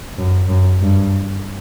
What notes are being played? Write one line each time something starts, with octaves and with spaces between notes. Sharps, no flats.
F#2
F#2
G2